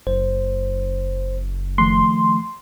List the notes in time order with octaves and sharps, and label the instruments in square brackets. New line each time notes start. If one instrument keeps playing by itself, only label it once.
[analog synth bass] F#1 [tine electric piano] C5
[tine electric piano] D#3 F3 A3 [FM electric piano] C6